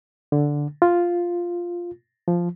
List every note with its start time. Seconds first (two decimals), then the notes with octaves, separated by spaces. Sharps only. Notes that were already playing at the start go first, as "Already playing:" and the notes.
0.32 D3
0.82 F4
2.28 F3